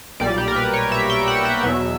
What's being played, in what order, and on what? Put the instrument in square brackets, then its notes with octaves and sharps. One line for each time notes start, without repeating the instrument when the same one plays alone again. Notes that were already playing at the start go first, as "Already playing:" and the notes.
[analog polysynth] B1 A#2 G3 D5
G4
A#4
B4
C#5
E5
G5
F#5
E5
E2 B2 F#3